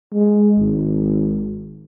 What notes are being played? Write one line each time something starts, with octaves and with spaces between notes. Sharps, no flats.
G#3
G#1